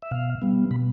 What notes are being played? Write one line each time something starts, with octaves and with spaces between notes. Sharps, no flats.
E5
B2 F5
G3 B3
B2 B5